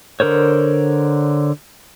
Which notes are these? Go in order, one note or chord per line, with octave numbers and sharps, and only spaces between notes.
D3 A#4 C5 C#5